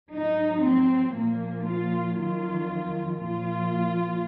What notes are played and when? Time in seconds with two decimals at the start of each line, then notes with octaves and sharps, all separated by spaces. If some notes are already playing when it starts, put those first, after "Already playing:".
0.13 G#2 F#3 D#4
0.64 C4
1.14 A#2 F3 A#3
1.66 F4
2.16 F2 D#3 F#3 F4
3.17 A#2 F3 F4